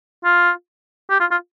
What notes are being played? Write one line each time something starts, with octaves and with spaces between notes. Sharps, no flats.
F4
G4
F4
F4